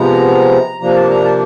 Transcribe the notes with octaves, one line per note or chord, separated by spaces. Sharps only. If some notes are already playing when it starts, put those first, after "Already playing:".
Already playing: C3 F3 G#3 B3 A#5
C3 F3 A#3 D4 A#5
A5
A#5
A5